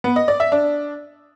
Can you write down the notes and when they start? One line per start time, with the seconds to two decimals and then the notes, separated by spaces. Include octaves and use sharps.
0.04 B3
0.16 D#5
0.28 D5
0.40 E5
0.52 D4